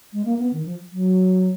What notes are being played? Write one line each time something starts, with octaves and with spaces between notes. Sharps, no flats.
G#3
A#3
B3
D#3
F3
F#3